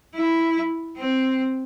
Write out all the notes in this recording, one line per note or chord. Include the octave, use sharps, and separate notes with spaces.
E4
C4